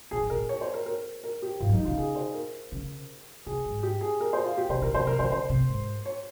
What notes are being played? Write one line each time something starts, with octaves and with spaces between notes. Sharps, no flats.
A#2 G#4
G2
A#2 A#4
C#5
C5
A#4
A#4
A#4
G4
G#2 F4
F3
D#4
D#3
C#3 F4
G#4
C5
A#4
C#3
C3 G#4
G#2
G4
G#4
A#4
C5
F4
G4
C3 C5
A#2 A#4
C#3 C5
C3 A#4
C#3 C5
C#3 C5
C3
G#2
C#5